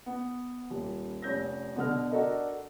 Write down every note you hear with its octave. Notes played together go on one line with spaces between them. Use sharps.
B3
D#1
F1 C#4 G6 A#6
B2 D3 F6
D4 F#4 A4 A#4 D#5